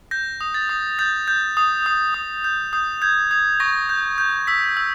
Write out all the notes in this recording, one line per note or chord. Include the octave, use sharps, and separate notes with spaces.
G6 A#6
D#6
A6
D#6
G6 A6
G6
D#6
D#6
D#6
G6
D#6 G6
G6 G#6
D#6 G#6
C#6 A#6
G6
G6
E6 B6
E6